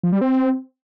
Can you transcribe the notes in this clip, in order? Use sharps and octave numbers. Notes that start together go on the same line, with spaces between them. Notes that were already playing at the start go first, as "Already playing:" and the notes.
F3
G3
C4